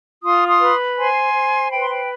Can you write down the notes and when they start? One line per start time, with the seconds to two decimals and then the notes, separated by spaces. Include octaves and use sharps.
0.23 F4 C6 D#6
0.48 C6 D#6
0.60 B4
0.97 C5 G#5 C6
1.34 C5
1.72 B4 G5 B5
1.81 C6
1.90 G5 B5